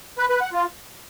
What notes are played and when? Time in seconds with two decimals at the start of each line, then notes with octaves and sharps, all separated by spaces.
0.18 B4
0.30 B4
0.41 F#5
0.52 F4